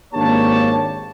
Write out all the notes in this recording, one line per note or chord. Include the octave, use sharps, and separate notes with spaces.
G#1 A#3 D4 G4 C#5 A5